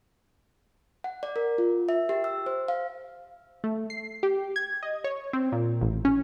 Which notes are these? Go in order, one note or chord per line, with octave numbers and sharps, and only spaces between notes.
F#5
D5
A#4
F4
E5
G4
E6
C5
F5
A3
C7
G4
G#6
D#5
C#5
C4
A#2
A1
C#4